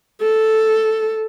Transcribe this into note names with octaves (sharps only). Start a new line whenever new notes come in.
A4